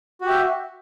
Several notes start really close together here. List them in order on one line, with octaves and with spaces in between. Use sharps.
F#4 G4 E5